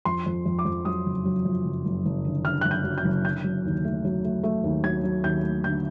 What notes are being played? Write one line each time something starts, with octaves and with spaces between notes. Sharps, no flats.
F2 C6
F2
F2
D6
F2
F#3 D#6
F#1
F#3
F2
F#1
F#1
F#1
D3
D3 F6
F#1 F#6
G6
F#3
G6
F#1
D3 G6
F#3
D#2
A3
F#3
A3
A3
D#2
F#3 G#6
F#3
D#2 G6
A3
D3 G6